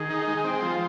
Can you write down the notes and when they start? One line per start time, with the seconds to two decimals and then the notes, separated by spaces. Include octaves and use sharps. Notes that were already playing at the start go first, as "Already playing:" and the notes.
Already playing: D#3 G#4
0.10 D#4
0.27 G#3
0.33 G#5
0.44 C4 G5
0.55 G5
0.62 F3 F5